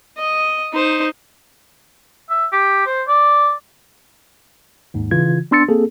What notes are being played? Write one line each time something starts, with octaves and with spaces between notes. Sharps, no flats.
D#5
D#4 C5
E5
G4
C5
D5
D#2 G#2
C#3 E3 F4 G#6
B3 D4 C6 E6 A6 C#7
A#3 C4 G#4 A4